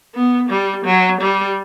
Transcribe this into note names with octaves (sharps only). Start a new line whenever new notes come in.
B3
G3
F#3
G3